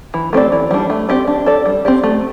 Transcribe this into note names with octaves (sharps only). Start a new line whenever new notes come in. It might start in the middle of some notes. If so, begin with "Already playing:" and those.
E3
A3 C4 G4 D5
E3
G3 D4
A3
C4 G4 D5
D4
A4 D5
G3
C4 G4 D5
A3